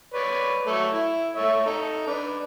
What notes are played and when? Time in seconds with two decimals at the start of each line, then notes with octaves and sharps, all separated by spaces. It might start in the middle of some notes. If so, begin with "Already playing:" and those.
0.14 B4 C#5 D5
0.67 F#3 A3 C#5
0.93 E4
1.36 A3 C#5 E5
1.66 D#4 A4
2.07 D4 B4